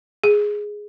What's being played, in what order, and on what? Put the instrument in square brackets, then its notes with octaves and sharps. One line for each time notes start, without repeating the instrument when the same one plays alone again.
[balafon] G#4